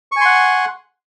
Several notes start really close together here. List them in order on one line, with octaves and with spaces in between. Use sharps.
C#6 G#5 C6 F#5